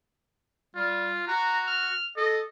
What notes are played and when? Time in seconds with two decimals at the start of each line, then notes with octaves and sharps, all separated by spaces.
0.75 G3 F4
1.28 F#4 A#5
1.67 F6
2.17 A4 D#5